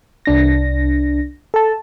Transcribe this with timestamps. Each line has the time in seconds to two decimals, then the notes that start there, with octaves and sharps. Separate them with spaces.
0.26 C2 D4 A#6
1.54 A4 A5